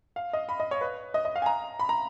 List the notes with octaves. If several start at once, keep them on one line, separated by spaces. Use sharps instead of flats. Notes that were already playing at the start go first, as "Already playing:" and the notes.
F5
D#5
B5
D#5
C#5
B4
D#5
D#5
F5
G#5
A#5
B5
A#5